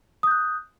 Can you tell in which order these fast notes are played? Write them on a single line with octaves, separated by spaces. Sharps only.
D#6 G6 F#6